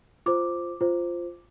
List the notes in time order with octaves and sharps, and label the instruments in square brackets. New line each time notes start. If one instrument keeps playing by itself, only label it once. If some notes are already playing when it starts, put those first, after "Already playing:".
[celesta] F4 C5 D6
F4 C5